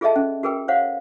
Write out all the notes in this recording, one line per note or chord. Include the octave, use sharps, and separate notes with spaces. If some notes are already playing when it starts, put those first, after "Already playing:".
F4 G#4 A4 D#5 E5 A5
C#4
F#4 G#4 A#4 B4 G5
C5 C#5 F5 F#5